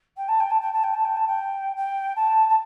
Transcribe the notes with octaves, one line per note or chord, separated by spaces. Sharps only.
G5
A5
G5
A5
G5
A5
G5
A5
G5
A5
G5
G5
A5
A5